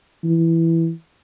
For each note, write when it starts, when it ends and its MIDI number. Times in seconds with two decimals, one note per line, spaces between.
0.24 0.91 52